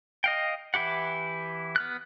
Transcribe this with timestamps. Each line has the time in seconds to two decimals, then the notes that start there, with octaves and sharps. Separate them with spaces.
0.24 D#5 F5 G5
0.74 E3 E4 G4 F#5
1.76 B3 F6 F#6